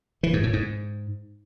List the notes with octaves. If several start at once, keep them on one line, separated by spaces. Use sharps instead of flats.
E3
G#2
A2
G#2